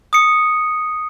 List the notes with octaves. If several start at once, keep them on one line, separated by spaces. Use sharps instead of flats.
D#6 C#7